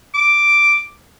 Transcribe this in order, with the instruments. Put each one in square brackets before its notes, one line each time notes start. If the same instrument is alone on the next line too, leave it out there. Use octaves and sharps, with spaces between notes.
[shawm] D6